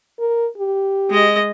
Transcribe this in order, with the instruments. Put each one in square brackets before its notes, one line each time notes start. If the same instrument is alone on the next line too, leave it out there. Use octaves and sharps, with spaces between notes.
[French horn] A#4
G4
[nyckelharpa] G#3 D#5